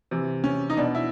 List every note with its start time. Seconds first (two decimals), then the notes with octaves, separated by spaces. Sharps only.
0.11 C3 E3
0.44 C#4
0.70 D#4
0.77 B2 D4
0.95 E4